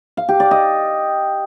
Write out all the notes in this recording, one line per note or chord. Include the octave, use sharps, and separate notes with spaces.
F5
G4
D5
D#5